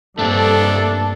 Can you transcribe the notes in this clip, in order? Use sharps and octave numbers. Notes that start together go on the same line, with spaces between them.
G2 A3 A#3 C4 D4 A4